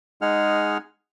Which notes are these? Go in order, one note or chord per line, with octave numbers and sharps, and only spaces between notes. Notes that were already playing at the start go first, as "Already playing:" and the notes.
G#3 D#4 G#4 F#5 F6